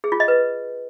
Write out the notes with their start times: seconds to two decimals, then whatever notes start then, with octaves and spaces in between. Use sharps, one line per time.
0.04 G#4
0.12 F4
0.20 D#5
0.28 B4